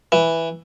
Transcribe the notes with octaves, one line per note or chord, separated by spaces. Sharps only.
E3